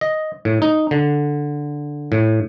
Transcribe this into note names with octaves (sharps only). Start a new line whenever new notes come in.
D#5
A2
D#4
D3
A2